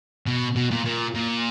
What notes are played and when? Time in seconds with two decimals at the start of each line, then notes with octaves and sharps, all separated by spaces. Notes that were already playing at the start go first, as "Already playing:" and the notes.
0.26 B2
0.56 B2
0.71 A#2
0.86 A#2
1.15 A#2